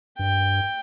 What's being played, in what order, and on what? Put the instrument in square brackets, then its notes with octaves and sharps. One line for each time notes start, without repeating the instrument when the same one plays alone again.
[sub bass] G2 [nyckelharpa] G5